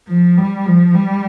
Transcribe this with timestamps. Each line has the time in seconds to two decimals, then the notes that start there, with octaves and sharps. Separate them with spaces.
0.09 F3
0.37 G3
0.66 F3
0.94 G3